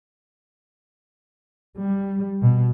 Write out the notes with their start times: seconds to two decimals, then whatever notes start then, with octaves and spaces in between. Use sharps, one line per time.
1.78 G3
2.41 B2